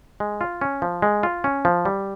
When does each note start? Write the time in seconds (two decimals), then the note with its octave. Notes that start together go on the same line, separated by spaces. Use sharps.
0.20 G#3
0.41 F4
0.61 C#4
0.82 F3
1.02 G#3
1.23 F4
1.44 C#4
1.65 F3
1.85 G3